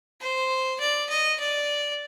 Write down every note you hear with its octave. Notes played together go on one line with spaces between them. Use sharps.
C5
D5
D#5
D5